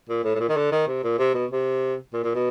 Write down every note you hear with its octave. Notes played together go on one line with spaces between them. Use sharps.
A#2
A2
A2
A#2
D#3
D3
D#3
C3
A#2
C3
B2
C3
A#2
A#2
B2